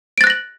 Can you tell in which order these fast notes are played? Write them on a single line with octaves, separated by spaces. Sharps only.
D7 A6 F#6 A#6 F#7